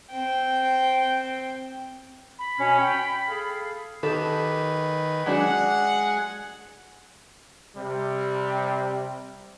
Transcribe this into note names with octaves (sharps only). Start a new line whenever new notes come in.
C4 G5
B5
B2 C#4
G5
G#4 A4 F5
D#3 G4 A4 B4
F#3 G#3 D4 F#4 G#4 F#5
C3 G3